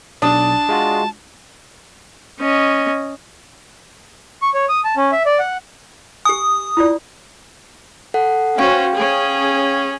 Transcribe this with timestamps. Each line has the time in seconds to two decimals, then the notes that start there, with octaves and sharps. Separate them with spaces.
0.22 B1 D4 A5 D#6
0.69 G#3 F4 F#4
2.40 C#4 D#5
4.42 C#6
4.54 C#5
4.69 D#6
4.84 A5
4.97 C#4
5.12 E5
5.26 D5
5.39 F#5
6.25 G4 G#5 D#6
6.77 E4 F4 D5
8.14 A4 F#5
8.58 C#4 F#4 C5 F5 G5
8.94 C#4 G#4